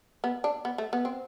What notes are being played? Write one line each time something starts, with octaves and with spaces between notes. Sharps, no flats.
B3
D4
B3
A3
B3
C4